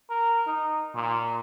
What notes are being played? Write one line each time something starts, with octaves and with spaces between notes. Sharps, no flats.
A#4
D#4
A#2